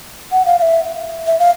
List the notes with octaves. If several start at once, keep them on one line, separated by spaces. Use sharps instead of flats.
F#5
F5
F5
E5
E5
F5